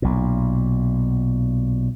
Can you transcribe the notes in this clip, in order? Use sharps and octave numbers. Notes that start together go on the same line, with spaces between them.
B1 A#2